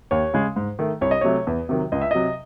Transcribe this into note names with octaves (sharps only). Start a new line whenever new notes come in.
D#2 C#5
C#3 G#3
G#2
D#3 A3
C2 C#5
D#5
C3 F#3 A3 C#5
E2
C3 D#3 F#3
C#2 D#5
E5
C3 F#3 D#5